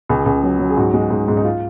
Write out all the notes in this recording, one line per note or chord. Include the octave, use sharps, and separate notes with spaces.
C#2 G#4
C#2
F#3
F#3
G#4
G#2 F#4
G#3
G#2
G#2
D#4
F4